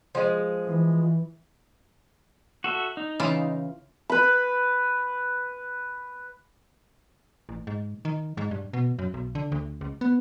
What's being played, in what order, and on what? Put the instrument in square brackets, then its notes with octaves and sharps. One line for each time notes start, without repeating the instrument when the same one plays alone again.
[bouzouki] F3 G#3
[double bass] E3
[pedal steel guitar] F#4 A4 E5
D#4
[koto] C#3 E3 F4
[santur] B4 B5
[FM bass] A1
G#2
D#3
G#2
G2
B2
F#2
B1
D3
D2
C#2
B3